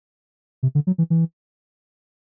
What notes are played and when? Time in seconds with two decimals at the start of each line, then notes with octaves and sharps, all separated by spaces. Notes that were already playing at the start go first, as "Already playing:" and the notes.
0.63 C3
0.75 D3
0.87 F#3
0.98 E3
1.10 E3